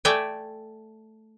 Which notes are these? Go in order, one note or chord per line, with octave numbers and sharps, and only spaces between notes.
A3 D5 E5 G5 G#5